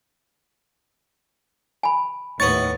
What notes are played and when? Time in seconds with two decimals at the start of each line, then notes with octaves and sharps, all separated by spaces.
1.83 G#5 B5
2.40 D#2 A2 B3 C#5 A6